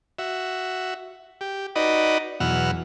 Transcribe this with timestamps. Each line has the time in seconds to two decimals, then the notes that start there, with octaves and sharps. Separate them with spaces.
0.19 F#4 E5
1.41 G4
1.76 D#4 F#4 B4 D5 D#5
2.40 E2 B2 F#3 F#5 E6 F6